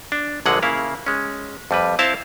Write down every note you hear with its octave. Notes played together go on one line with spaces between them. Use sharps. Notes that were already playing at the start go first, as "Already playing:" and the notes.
D4
A#1 D3 F#3 G#3 G#4 F#5
C#3 A#3 E4 F5
G#3 C#4
F2 G3 B4
C4 E4 C5 F5 A5